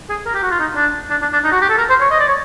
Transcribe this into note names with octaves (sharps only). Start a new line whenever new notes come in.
G#4
A#4
G4
F#4
F4
D#4
D4
D4
D4
D4
D#4
F#4
G4
A4
A#4
C5
C#5
D#5
D5
C#5